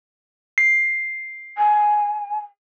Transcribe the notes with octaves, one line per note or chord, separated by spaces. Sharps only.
C7
G#5